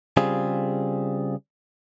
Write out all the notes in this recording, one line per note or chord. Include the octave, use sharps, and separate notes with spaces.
C#3 G3 C4 F4 G#4